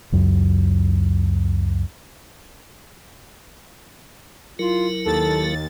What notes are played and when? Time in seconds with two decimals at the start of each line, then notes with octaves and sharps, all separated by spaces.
0.12 C#2 F#2
4.59 F#3 E4 F4 A#4
5.06 D#2 A4 A6